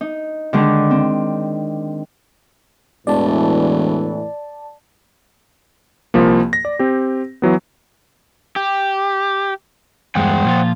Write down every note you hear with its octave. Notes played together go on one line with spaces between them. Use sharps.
D#4
D3 D#3 G#3 D4
C4
E1 A2 E3 D5 A5
C2 F3 A#3
A#6
D5
C4 G4
E3 F#3 B3
G4
E2 G2 G#3 C5 F#5 G5
A#2 F3 F4